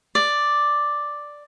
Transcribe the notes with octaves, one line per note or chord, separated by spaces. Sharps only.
D5